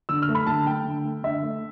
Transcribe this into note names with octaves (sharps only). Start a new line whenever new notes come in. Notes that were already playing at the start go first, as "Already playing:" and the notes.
D3 E6
F6
A3
B5
D3 A5
A3 G5
D3
A3
D3 E5
A3